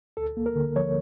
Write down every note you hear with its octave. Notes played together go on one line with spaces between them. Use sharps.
D2 A4
A#3
A#4
D3
F3 C#5